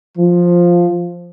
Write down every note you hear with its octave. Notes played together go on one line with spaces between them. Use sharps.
F3